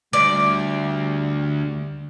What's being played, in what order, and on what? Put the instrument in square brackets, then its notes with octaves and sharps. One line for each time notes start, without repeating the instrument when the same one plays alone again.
[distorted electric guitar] D2 [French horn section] G3 [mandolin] D5